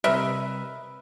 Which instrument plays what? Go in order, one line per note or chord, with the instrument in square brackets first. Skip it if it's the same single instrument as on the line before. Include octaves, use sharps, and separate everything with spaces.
[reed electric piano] C3 G3 [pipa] A#4 D#5 E5 [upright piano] B4 E6